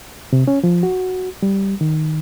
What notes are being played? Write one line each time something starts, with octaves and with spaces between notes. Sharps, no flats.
C3
C#4
F3
F#4
G3
D#3